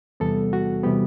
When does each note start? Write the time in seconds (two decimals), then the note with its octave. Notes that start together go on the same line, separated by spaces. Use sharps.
0.20 E2 C3 E3 G3 B3 A4
0.53 F#4
0.84 C3 E3 G3 B3 G4